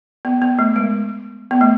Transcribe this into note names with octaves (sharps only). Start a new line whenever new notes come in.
B3
B3
A3
G#3
B3
A3